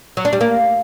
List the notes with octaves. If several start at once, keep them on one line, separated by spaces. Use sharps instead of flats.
F#3
D4
G3
A#3